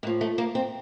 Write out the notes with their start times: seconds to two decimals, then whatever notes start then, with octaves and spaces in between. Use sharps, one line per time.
0.03 A2 F3 A#3
0.21 A3
0.38 A#3
0.55 C4